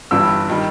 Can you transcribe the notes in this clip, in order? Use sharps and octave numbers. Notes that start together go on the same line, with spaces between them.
G1 G2 E3 G3 E6
D#3 G3